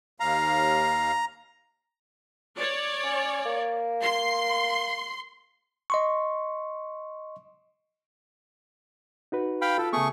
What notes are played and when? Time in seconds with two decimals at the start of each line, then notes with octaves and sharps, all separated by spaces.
0.20 D#2 F5 A#5
2.57 C#5 D5
3.04 C#4
3.45 A#3
4.02 C6
5.90 D#5 C6 C#6
9.32 D#4 F#4 B4
9.62 F5 G5 B5
9.78 F4 A4
9.93 C#3 A3 B3 G#4 C#6